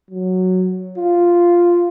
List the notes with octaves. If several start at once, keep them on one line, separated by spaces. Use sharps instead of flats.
F#3
F4